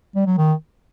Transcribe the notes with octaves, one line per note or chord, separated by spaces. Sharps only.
G3
F#3
D#3